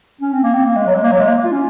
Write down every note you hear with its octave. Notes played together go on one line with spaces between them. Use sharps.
C#4
C4
A#3
C4
A#3
G#3
F#3
G#3
A#3
F#3
G#3
A#3
F4
C#4